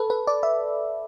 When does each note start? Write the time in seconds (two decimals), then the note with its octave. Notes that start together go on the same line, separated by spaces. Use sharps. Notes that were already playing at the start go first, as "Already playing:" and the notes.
Already playing: A4 B4
0.10 B4
0.27 D5
0.43 E5